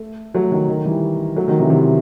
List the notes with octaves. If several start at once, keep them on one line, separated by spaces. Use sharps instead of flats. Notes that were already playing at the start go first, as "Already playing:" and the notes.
Already playing: A3
F#3 A3
D#3 F#3
D#3
E3 G3
F#3 A3
D#3 F#3
C3 E3
F#3
C3 E3